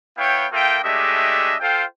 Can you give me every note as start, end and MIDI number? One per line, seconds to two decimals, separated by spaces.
0.18 0.46 59
0.18 0.46 64
0.18 0.46 73
0.18 0.46 77
0.18 0.46 79
0.53 0.79 58
0.53 0.79 65
0.53 0.79 69
0.53 0.79 76
0.53 0.79 79
0.83 1.54 56
0.83 1.54 57
0.83 1.54 62
0.83 1.54 67
0.83 1.54 75
0.83 1.54 76
1.60 1.83 65
1.60 1.83 69
1.60 1.83 72
1.60 1.83 77
1.60 1.83 79